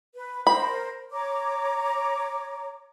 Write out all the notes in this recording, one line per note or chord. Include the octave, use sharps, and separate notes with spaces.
B4
A#4 C5 B5
C#5 A#5 D6